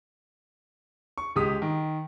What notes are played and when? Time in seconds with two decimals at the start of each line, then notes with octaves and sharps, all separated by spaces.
1.18 C#6
1.36 C#2 G#3 G4 D#6 B6
1.62 D#3